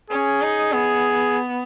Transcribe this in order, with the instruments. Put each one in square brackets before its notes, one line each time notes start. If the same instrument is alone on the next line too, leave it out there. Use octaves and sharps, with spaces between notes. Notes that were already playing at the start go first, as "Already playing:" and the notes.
[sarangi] C#4 [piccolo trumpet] G#4
[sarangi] D#4
[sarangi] B3 [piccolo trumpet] G#4